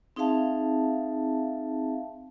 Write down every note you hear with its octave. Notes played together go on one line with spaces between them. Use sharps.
C4 D#4 G#4 E5 F5 A5